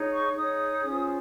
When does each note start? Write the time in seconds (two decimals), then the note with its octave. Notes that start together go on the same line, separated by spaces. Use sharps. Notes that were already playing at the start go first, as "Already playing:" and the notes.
Already playing: D#4 G#4 C#5
0.12 C#6
0.37 D#4 G#4 C#5 D#6
0.86 C#4 F4 G#4 C5